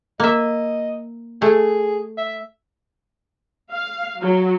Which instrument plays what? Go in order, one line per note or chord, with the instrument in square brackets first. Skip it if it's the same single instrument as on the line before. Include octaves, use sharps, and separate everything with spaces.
[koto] A#3 E5 [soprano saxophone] D#5
[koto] A3 [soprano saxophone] G#4
[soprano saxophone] E5
[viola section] F5
F#3